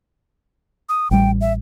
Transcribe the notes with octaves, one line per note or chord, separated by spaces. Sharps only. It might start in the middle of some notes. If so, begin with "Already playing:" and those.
D#6
A1 G3 G5
E5